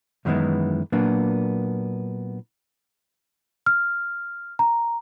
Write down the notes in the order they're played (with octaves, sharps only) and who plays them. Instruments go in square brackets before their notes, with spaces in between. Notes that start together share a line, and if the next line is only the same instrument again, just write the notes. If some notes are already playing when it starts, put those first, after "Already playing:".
[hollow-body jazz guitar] F#2 D#3 E3 G#3 B3 E4
A#2 F#3 A#3 B3 D4
[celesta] F6
A#5